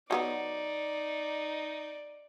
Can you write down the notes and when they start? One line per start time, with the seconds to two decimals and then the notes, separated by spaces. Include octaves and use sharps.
0.11 F#3 A3 B3 D#4 D5